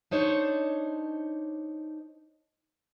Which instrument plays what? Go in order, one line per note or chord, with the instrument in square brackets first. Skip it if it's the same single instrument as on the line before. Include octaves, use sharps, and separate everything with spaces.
[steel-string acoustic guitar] D4 D#4 C5 C#5